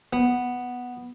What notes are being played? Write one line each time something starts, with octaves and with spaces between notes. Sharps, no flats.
B3